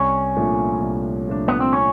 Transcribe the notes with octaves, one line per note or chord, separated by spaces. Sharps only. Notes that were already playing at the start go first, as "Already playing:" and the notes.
Already playing: C2 C#4
A#2 F3 A3 D4
C2
A#2 F3 A3 D4
B3
C4
C#4